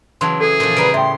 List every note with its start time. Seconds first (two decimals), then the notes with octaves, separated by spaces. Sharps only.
0.21 C#3 E3 F#3 A5 C6
0.41 G#4 A4
0.60 A#2 E3 F3
0.77 C#3 G3 B3 B4 A#5 D7
0.94 A2 E5 G5 C6